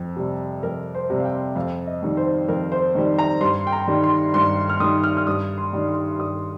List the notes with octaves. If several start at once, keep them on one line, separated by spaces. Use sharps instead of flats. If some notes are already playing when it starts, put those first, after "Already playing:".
Already playing: F2
C3 G3
F2 A#4
C5
C3 G3
F5
G5
F2 F5
D#5
D#3 G3
C5
F2 A#4
C5
D#3 G3
A#5
G2 C6
G5
A#5
D#3 G3
C6
G2 C6
F6
D#3 G3 D#6
F6
F6
G2 D#6
C6
D#3 G3
C6
G2 D#6